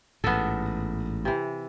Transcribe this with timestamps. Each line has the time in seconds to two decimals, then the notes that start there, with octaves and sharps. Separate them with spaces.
0.24 A1 G#2 B3 A4
1.25 C3 E3